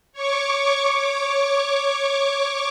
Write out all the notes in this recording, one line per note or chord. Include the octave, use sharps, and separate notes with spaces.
C#5 C#6 D6